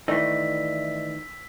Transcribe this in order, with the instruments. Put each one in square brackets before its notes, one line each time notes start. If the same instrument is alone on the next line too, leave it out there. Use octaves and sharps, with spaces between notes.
[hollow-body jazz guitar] D#3 E3 A3 [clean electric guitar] D5 D#5 [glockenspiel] E6 B6